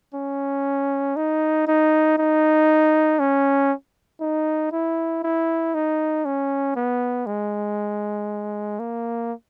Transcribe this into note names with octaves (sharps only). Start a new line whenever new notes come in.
C#4
D#4
D#4
D#4
C#4
D#4
E4
E4
D#4
C#4
B3
G#3
A#3